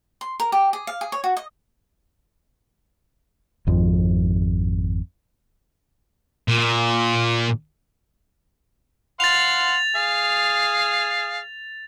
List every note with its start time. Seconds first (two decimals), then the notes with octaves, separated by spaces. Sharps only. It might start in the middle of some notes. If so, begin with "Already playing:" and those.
0.21 C6
0.40 A#4
0.52 G4
0.73 G#4
0.87 F5
1.01 G#4
1.12 C#5
1.24 F#4
1.37 D#5
3.67 G#1 F2 F3
6.48 A#2
9.20 C5 F5 F#5 A6 F7
9.96 G#4 F5